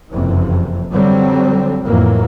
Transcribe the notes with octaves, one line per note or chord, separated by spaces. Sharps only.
F#1 F2 C3 E3
D3 F#3 G3 C4
F2 A2 E3 F#3 A#3